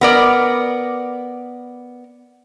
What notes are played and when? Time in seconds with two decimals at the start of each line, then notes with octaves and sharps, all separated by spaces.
0.01 B3 A#4 D5